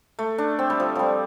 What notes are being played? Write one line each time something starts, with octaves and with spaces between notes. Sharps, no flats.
A3
D4
C4
G3
F3
F3 G3